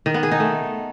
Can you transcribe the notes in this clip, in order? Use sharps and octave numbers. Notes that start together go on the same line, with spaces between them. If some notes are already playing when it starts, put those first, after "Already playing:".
D#3
B3
G#4
D#4
A3